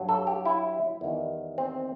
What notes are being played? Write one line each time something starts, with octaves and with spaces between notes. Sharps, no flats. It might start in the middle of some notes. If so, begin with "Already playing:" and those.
Already playing: G2 F#3
A4
G4
E4
E2 D#3 G3
C4